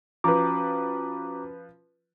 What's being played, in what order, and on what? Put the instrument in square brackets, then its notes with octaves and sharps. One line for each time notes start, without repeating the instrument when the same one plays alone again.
[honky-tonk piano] F3 B4 [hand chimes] C#4 F#4 [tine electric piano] A#5 D6